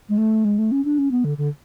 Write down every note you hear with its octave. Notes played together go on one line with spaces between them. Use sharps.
G#3
A3
G#3
A3
C#4
D4
C#4
B3
D3
D3